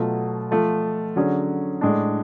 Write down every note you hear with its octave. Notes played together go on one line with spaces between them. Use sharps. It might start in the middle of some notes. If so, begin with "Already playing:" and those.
Already playing: B2 F#3 A3 F4
F3 A3 F4 A4
D3 F#3 C#4 G#4
A2 G#3 D4